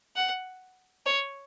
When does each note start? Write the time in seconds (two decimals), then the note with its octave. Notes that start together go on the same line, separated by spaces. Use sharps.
0.16 F#5
1.06 C#5